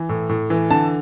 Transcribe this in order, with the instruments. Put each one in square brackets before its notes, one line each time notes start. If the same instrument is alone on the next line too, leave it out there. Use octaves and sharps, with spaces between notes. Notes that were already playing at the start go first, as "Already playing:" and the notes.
Already playing: [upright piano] E3
A2
A2
E3
D3 A5